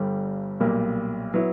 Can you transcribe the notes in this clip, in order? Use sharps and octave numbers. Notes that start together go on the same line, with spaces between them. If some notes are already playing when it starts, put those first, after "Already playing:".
Already playing: G1 G2 D3 G3
B1 A#2 G3 A#3
F#3 B3 E4